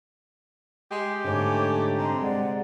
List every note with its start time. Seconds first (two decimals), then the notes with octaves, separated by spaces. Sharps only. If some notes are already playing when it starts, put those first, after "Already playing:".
0.91 G#3 G4
1.25 G#2 D3 A3 C#5 G#5 D6
1.98 C3 D#5 A#5 C6
2.22 G#3 D5 F#5